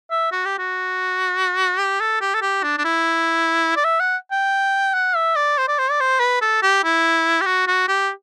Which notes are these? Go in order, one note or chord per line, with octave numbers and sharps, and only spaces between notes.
E5
F#4
G4
F#4
G4
A4
G4
A4
G4
D4
D4
E4
D5
E5
F#5
G5
F#5
E5
D5
C5
D5
C5
D5
C5
B4
A4
G4
E4
G4
F#4
F#4
G4